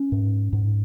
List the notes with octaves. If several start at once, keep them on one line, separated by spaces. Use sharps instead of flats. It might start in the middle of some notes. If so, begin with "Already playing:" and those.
Already playing: C#4
G#2
G#2